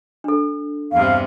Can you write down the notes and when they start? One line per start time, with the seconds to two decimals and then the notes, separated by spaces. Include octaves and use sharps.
0.24 D4 A4
0.92 E2 G2 C3 F5